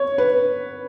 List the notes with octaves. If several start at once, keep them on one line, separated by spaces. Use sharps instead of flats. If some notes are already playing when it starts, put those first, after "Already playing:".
Already playing: C#5
B4